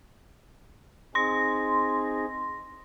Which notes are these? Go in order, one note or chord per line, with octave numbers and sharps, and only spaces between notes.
C4 D#4 G#4 C6 A#6